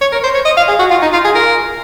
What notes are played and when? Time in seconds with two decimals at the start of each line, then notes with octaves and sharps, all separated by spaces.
0.01 C#5
0.12 A#4
0.24 C5
0.34 C#5
0.45 D#5
0.57 F5
0.68 G#4
0.79 F#4
0.90 F4
1.02 D#4
1.13 F4
1.25 G#4
1.35 A#4